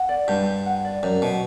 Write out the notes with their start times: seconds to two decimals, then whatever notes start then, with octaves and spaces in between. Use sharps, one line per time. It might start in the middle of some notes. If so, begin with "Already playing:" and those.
Already playing: F#5
0.09 D5
0.28 G2 G4
0.46 G4
0.66 F#5
0.85 D5
1.03 F#2 G4
1.22 B2 G4